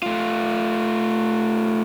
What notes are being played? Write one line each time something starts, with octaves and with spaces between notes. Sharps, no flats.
A3 F4